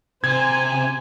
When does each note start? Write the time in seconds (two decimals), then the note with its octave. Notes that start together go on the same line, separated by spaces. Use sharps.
0.24 C3 C5 G#5 G#6